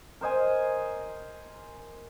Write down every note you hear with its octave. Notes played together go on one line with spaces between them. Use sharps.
A#4 C5 D#5 G#5